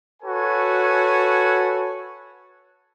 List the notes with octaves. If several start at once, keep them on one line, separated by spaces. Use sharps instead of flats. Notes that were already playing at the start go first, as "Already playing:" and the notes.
F#4 A4 B4 C#5 G#5